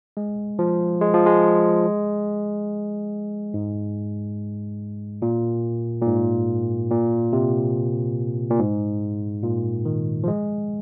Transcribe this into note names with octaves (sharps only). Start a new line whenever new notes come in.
G#3
F3
G#3
F3
G#3
G#2
A#2
A#2
G#2
A#2
C3
A#2
G#2
A#2
D#3
F3
G#3